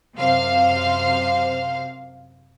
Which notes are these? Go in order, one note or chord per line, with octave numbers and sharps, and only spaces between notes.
F#2 C3 C5 F5